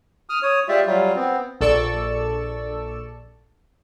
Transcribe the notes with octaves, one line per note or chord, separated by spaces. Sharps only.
D#6 F6
C#5 D#6
G#3 F4 G4 D5 E5
F#3 G3 F4
B3 C4
A#1 A4 D5 C#6 E6